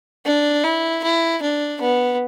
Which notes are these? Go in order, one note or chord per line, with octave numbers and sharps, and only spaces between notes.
D4
E4
E4
D4
B3